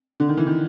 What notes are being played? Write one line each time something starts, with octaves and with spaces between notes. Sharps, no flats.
D3
D#3
E3
D#3